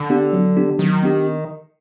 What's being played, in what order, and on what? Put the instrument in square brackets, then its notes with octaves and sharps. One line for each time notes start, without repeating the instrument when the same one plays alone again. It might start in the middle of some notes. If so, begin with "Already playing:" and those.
Already playing: [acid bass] D3
[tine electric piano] B3 D4 G4
F#3
B3 D4 G4
[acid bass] D#3 [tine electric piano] F#3
[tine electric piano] B3 D4 G4